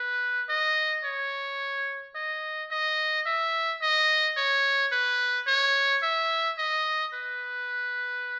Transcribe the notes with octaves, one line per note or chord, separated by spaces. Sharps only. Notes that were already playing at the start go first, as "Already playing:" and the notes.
Already playing: B4
D#5
C#5
D#5
D#5
E5
D#5
C#5
B4
C#5
E5
D#5
B4